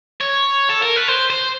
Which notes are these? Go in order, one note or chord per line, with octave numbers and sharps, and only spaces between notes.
C#5
A4
A#4
B4
C5
C5